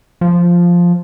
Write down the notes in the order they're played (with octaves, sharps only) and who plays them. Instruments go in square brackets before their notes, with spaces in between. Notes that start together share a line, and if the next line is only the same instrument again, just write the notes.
[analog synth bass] F3